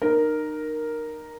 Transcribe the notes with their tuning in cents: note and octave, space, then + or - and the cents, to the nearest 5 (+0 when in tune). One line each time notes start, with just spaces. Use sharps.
D#4 -30 A#4 +0